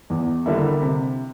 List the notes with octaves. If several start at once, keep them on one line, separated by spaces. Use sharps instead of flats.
E2
D3 G3 A#3 E4
C3